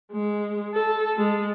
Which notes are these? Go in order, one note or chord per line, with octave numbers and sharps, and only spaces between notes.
G#3
A4
G#3